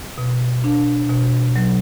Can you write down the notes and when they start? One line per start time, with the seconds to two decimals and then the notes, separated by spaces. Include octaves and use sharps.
0.18 B2
0.64 D4
1.10 B2
1.56 F#3